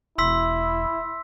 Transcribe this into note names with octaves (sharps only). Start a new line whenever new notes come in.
E1 E4 C6 E6 B6